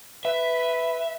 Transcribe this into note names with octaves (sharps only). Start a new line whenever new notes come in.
B4 E5